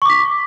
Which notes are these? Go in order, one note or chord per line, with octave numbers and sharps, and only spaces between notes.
C#6 D6 B6